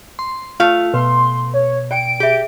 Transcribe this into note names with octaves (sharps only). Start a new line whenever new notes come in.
C6
A3 F4 F5
B2 B4 C6
C#5
D5 G5 D7
G4 G#4 E5